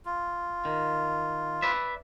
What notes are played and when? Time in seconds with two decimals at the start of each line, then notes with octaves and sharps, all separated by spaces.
0.05 F4
0.65 D#3
1.62 B4 D5 E5